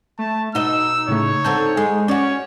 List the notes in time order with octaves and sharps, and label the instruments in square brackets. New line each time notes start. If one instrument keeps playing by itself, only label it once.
[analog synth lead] A3 [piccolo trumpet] A5
[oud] B2 D#5 [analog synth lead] D#4 [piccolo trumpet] E6
[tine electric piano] A2 C#3 A3 [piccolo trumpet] C#5
[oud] D3 C4 A4 [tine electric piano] G6
[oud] G#3
[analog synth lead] C#4 [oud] F#4 D5 [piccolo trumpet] C#5